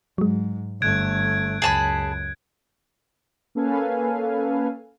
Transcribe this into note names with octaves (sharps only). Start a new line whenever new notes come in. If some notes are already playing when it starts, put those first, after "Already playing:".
G#2 F#3 G#3
G1 A3 F#6 G#6 D7
C#2 F#2 G#4 A5 B5
A#3 C#4 A4 B4 F5 G#5